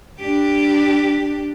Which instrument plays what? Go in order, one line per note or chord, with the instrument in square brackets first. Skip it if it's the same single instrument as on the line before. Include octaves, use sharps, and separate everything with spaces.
[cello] D4 G4